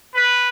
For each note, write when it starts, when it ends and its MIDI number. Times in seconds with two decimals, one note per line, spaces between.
0.15 0.49 71